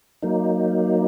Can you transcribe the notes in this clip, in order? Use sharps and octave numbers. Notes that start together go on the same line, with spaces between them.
F#3 A#3 D#4